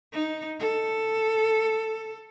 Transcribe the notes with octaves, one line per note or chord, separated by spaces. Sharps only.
D#4
A4